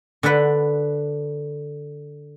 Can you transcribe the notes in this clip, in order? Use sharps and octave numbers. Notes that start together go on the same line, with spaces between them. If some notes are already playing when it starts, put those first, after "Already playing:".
D3 D4 A4 B4 F#5